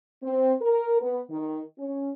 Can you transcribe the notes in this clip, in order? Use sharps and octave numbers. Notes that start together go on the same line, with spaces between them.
C4
A#4
B3
D#3
C#4